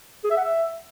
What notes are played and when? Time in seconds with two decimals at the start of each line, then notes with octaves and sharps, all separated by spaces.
0.24 G#4
0.31 E5
0.37 F#5
0.44 E5